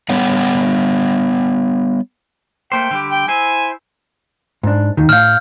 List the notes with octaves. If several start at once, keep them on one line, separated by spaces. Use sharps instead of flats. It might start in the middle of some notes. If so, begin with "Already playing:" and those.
G3 B3 C#5 F#5
A3 A#3 C5 G5
D3 G3 G4
G5
E4 C5 G#5
G#2 D4
D#2 D#3
A2 F5 F6 G6